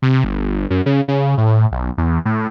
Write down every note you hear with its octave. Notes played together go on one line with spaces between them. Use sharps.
C3
G1
F#2
C#3
C#3
A2
B1
E2
A2